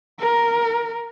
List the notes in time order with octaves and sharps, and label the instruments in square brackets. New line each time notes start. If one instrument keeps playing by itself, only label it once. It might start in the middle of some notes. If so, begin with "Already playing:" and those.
[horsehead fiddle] A#4